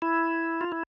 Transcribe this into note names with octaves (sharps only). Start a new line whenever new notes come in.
E4
F4
E4